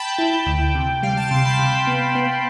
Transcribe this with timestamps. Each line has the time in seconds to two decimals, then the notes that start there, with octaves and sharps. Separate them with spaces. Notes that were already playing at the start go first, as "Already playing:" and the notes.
Already playing: G5 A5 B5
0.19 E4
0.46 D2
0.75 C3
1.03 G3 F5
1.17 A5
1.31 C3 C6
1.45 B5
1.59 C3
1.87 B3
2.15 B3